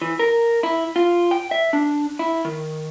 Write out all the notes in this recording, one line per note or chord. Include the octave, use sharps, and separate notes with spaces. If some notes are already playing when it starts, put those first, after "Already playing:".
E3
A#4
E4
F4
G5
E5
D4
E4
D#3